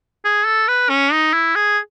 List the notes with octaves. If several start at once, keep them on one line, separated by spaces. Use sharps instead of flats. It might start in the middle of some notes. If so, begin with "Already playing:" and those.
G#4
A4
B4
C#4
D#4
E4
G#4